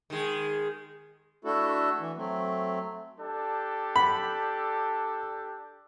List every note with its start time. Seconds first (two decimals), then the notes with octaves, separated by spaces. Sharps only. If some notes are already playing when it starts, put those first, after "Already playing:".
0.10 D#3 G#3
1.45 A3 D4 E4 F#4 A4
2.00 E3
2.17 F#3 A3 C4
3.20 D4 G4 A4
3.96 B5